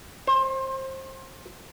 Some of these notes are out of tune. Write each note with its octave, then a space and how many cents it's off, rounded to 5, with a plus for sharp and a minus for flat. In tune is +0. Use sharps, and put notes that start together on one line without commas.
C5 +25